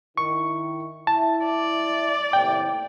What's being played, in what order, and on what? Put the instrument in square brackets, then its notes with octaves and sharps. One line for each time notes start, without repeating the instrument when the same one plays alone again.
[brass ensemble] D#3 E4 [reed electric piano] C#6
[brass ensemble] E4 E5 [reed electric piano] A5
[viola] D5
[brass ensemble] D#2 A2 C3 [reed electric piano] G5